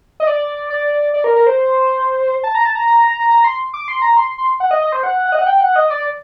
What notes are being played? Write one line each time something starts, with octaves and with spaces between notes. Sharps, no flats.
D#5
D5
D5
D5
A#4
A#4
C5
A5
A#5
A5
A#5
A#5
A#5
A#5
C6
D6
C6
A#5
C6
C6
F#5
D#5
D#5
C5
F#5
F#5
D#5
F#5
G5
F#5
D#5
D5